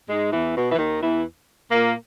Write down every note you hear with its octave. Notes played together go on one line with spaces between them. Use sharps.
G#2 G#3
E2 E3
B2
E3
D#2 D#3
E2 E3
A#2 A#3